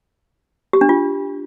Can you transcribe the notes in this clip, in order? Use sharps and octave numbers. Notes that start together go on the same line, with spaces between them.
G4
D4
F4